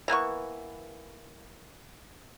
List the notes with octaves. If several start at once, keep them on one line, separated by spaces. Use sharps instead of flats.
E3 A#3 B3 C#6